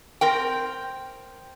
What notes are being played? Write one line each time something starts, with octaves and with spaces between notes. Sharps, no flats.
C4 A#4 G5